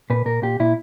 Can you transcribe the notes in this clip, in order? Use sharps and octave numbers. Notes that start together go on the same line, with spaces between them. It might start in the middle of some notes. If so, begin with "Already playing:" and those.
A#2 B4
A#2 A#4
A#2 G4
A#2 E4